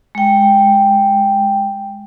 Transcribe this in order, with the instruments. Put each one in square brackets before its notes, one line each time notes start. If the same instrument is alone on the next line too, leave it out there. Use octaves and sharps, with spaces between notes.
[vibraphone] G#3 G5